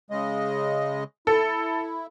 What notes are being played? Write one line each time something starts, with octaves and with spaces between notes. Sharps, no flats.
C#3 G#3 D#5
E4 A4